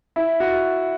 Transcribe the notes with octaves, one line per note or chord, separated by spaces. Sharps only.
E4
F#4